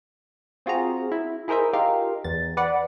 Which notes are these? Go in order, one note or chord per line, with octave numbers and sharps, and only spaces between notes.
C4 F4 F#4 G#4 A#5
E4
E4 G#4 A#4 C5 D#5 E5
D#4 F4 G4 A#4 F5
E2 A6
B4 D5 F#5